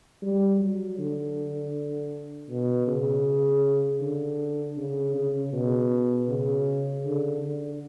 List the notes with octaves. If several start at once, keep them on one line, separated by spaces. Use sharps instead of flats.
G3
F#3
D3
B2
C#3
D3
C#3
C#3
B2
C#3
D3
D3